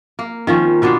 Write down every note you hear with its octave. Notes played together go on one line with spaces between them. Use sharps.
A#3
D#3 F3 C#4
B2 B3 D4 C5